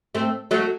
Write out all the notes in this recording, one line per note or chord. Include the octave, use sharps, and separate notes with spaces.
A3 C4
F#3 A3